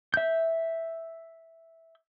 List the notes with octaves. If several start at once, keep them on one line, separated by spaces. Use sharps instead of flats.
E5 G6